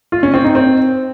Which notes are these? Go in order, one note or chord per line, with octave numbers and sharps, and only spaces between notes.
F4
C#4
C4
D#4
C4